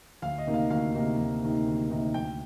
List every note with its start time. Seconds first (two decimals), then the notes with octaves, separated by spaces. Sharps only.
0.22 D2 F5
0.38 D#5
0.47 C3 D#3 A#3 D#4
0.54 F5
0.70 D2 F5
0.95 C3 D#3 A#3 D#4
1.18 D2
1.42 C3 D#3 A#3 D#4
1.67 D2
1.90 C3 D#3 A#3 D#4
2.14 D2 G5